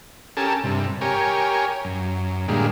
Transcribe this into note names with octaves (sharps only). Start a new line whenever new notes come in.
C#4 G4 A4 A#4 G#5 A5
G2 C3
G4 A#4 C#5 G#5
F#2
A2 D3 G3 G#3 A#3